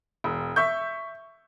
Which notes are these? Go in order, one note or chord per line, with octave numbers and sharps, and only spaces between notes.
E1
E5 C#6 G6